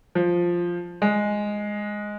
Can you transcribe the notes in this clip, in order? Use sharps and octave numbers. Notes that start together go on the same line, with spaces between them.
F3
G#3